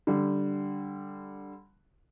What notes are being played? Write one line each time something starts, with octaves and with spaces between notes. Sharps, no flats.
D3 G3